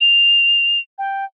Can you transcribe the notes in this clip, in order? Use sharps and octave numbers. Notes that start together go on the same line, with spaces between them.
F7
G5